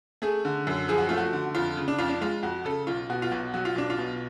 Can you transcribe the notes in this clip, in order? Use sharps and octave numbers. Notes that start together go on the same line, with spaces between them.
A3 G#4
D3
F#2
F3 G#4
F#4
A3 F4
F#4
D3
F2 F4
C#3
D4
F2 F4
D4
G#3 F4
F2 F#4
C#3 A4
B1 F4
B2 F#4
F4
B1 F#4
F#3 F#4
F4
B1 D4
F4
B2